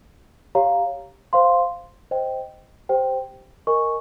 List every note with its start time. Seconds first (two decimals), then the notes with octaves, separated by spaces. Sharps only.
0.55 G4 C#5 F5 A#5
1.33 C5 F5 C6
2.11 C5 D#5 G5
2.89 G4 C5 G5
3.67 A#4 D#5 G#5 C#6